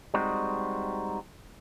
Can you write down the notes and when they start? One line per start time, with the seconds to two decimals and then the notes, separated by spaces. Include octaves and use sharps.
0.14 G3 G#3 C4 D#4 F#4